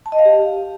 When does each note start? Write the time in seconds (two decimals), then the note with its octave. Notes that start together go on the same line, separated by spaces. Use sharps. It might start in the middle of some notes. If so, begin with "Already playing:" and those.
0.06 A5
0.12 D#5
0.19 F5
0.25 G4